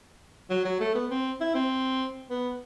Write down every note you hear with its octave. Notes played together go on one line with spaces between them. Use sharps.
F#3
F#3
A3
B3
C4
E4
C4
B3